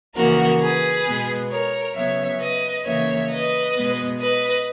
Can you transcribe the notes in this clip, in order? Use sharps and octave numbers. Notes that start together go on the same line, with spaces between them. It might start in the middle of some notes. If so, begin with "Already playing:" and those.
C#3 E3 A#3 F#4 A#4
G#4 B4
B2 G#3 B3
A#4 C#5
C#3 F#3 B3 C#5 E5
B4 D#5
C#3 E3 A#3 C#5 E5
B4 D#5
B2 G#3 B3
B4 D#5